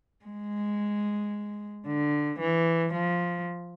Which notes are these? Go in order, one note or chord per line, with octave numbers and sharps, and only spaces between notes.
G#3
D3
E3
F3